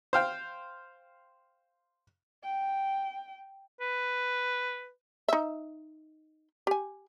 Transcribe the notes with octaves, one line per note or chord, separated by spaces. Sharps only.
C5 F5 G5
G5
B4
D#4 E5
G4 G#5